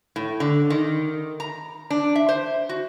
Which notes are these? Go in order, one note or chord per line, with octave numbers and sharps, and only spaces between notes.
A2
D3
D#3
A#5
D4
E5
C5
F#4